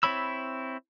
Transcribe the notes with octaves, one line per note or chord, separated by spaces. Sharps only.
C4 E4 C#5 B5 E6